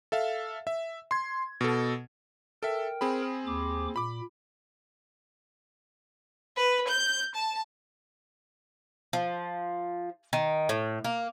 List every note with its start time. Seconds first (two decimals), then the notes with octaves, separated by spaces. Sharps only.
0.12 A4 E5 F5
0.67 E5
1.11 C6 G#6
1.61 B2 A4
2.63 A4 A#4 E5 G5
3.01 C4 G#4 B5
3.46 D#2 D6
3.96 A#2 B5 D6
6.56 B4
6.89 G6
7.33 A5
9.13 F3
10.33 D#3
10.69 A2
11.04 A#3